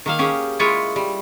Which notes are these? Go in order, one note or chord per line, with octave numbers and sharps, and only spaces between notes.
D#3 A#3 F5
C#4 G4 G#4
G#3 E4 F4 C#5 D#5
G3